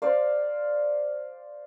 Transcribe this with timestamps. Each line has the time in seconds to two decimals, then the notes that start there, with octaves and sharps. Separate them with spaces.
0.02 C5 D5 F5